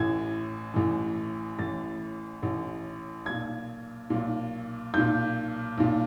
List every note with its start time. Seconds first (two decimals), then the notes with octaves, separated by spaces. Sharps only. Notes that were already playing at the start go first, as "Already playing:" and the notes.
Already playing: A1 A2 E3 G#6
0.74 A1 A2 E3
1.58 A1 A2 E3 A6
2.42 A1 A2 E3
3.26 B1 A#2 G#6
4.10 B1 A#2
4.94 B1 A#2 G6
5.77 B1 A#2